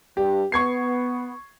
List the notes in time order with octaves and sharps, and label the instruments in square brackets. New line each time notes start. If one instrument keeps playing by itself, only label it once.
[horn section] G2 [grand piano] G4
[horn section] B3 [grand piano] C#6 G#6 C7